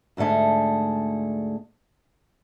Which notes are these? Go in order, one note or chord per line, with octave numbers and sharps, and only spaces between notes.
D2 G#2 D3 A3 G#4